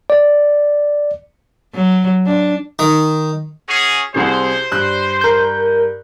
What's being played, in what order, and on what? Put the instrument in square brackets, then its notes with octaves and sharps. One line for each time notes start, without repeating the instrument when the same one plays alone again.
[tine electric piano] D5
[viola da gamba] F#3
D4
[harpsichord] D#3
[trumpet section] C#4 F#4 G#4
[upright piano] C2 C3 G#4 [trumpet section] C5
[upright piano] G2 F#6
[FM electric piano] A#4 G6